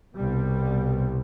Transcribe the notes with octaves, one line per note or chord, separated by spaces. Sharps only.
C2 B2 G3